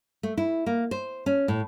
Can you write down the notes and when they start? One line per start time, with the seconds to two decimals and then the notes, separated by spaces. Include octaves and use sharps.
0.23 A3
0.38 E4
0.66 A#3
0.91 C5
1.26 C#4
1.48 A2